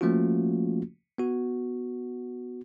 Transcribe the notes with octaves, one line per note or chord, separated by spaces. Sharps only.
F3 A3 A#3 C#4 F4 F#4
B3 F#4